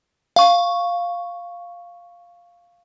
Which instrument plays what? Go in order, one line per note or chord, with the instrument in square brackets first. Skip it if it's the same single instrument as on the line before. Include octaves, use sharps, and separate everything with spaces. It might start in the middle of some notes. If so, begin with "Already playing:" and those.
[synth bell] F5 C#6